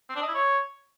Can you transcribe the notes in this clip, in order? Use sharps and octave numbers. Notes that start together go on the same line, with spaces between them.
C4
D4
D#5
E4
C#5